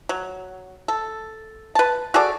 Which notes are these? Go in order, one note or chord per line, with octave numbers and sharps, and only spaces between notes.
F#3
A4
B4 A5
F#4 G#4 A4 D5